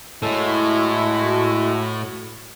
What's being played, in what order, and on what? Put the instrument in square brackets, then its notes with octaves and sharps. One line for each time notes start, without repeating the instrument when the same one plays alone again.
[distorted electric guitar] A2 [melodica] G#3 A4 [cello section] E4 F#4